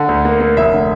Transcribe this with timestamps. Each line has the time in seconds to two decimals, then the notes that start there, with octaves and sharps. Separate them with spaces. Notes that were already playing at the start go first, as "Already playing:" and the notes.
Already playing: D3
0.08 D2
0.25 A#3
0.40 A#3
0.57 F1 E5
0.74 D3